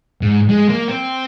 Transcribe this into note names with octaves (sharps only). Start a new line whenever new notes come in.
G#2
G#3
A#3
C4